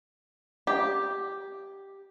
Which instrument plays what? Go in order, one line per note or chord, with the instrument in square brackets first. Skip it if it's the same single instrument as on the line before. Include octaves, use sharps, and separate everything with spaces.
[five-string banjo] G4